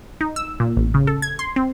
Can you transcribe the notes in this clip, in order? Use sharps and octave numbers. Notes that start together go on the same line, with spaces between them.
D#4
E6
A#2
A1
C#3
A4
G#6
C6
C4